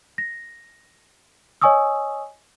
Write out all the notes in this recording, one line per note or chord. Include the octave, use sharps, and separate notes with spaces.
A#6
C#5 D#5 G#5 C#6 D#6 E6